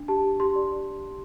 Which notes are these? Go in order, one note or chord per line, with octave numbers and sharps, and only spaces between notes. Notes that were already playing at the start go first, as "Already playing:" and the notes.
Already playing: D4
G4 A5
G4
G4 C6
D5
D5